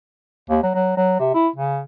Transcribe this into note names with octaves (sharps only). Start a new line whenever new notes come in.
D#2
F#3
F#3
F#3
C3
E4
C#3